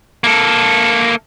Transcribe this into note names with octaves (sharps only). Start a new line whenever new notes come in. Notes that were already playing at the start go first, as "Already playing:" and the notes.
A#3 A4